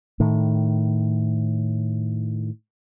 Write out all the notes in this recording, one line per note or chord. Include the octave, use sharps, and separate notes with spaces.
A2 D#3